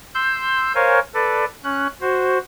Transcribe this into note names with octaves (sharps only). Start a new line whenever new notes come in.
C6 E6 G6
A#4 C5 C#5 F5 G#5
A4 B4 D5
C#4 F#6
F#4 C5